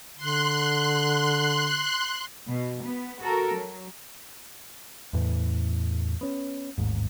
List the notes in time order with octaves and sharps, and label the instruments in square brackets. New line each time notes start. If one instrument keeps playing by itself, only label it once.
[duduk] D3 [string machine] C6 F#6
[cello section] B2
B3
F#4 A4 A#4
F#3
[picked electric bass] E2 A2 E3
B3 C#4
A1 D#2 G#2